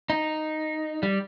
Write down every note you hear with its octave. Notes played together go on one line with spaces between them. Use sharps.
D#4
G3